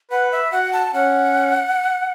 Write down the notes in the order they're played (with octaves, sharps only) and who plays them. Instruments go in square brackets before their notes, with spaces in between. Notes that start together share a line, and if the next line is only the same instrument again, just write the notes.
[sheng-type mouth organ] B4 [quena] F#5
[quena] E5
[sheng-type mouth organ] F#4 [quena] F#5
[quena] A5
[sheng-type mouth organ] C#4 [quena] F#5